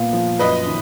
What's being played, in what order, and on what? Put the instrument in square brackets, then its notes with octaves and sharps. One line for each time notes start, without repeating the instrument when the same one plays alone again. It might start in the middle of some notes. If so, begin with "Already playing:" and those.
Already playing: [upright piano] A#2 B3 F4
F3
[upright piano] F#2 [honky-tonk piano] B4 D#5
[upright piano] D#3